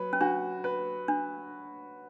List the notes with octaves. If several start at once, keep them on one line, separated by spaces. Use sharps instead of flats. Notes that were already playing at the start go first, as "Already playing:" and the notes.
Already playing: F#3 B4
C#4
D4 F#4
B4
D4